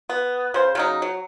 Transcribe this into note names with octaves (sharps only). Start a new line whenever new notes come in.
B3
C#3 C5
C#3 F#3 D#4
F#3